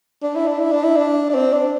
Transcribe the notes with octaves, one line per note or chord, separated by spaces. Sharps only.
D4
E4
D4
E4
D4
E4
D4
D4
C4
D4